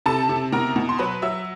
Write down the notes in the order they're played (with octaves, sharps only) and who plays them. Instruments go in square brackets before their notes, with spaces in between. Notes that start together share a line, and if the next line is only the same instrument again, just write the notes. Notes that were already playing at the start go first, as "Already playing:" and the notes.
[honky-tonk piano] C3 A4 A5
C3
B2 A#4 A#5
B2
C6
F#3 B4 B5
F#3 E5 E6